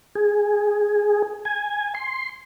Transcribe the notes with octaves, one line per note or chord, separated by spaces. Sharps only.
G#4
G#5
C6